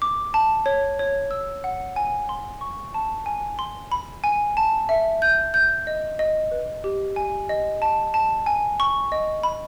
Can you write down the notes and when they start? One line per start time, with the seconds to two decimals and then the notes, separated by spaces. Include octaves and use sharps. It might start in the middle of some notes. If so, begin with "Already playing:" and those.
0.02 D6
0.34 A5
0.66 C#5
0.99 C#5
1.31 E6
1.64 F#5
1.96 G#5
2.29 C6
2.61 C#6
2.94 A5
3.26 G#5
3.59 C6
3.92 B5
4.24 G#5
4.57 A5
4.89 E5
5.22 G6
5.54 G6
5.87 D#5
6.19 D#5
6.51 B4
6.84 G4
7.16 G#5
7.49 D#5
7.82 A5
8.14 A5
8.46 G#5
8.80 C#6
9.12 D#5
9.43 B5